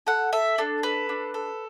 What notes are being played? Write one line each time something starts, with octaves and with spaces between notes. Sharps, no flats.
A4 F#5
A4 E5
D4 A4
A4 B4
D4
A4